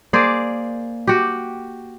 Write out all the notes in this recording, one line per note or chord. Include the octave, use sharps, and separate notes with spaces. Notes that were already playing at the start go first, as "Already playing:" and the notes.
A#3 G#4 C5 D5
F#4 G4